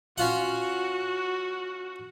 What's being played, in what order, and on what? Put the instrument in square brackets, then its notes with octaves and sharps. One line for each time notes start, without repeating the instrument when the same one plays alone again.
[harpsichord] C#4 F4 F#5 [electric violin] F#4